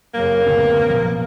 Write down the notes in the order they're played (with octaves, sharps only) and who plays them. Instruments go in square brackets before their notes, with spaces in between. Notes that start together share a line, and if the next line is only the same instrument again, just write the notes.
[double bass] F#2 C#3 [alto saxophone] A#3
[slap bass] F#1 D2 C#4 [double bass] C3 B3
[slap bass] A#2 F3